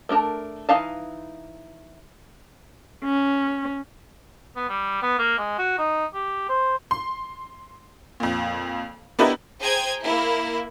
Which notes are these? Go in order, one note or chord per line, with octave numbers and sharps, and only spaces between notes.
A3 D4 A#4 A5
E3 D#4 F5 A5
C#4
B3
G3
B3
A#3
G#3
F#4
D#4
G4
C5
C6
F2 A#2
B3 D4 E4 G4 A#4 D#5
G#4 C5 G5 A#5 G#6
A#3 E4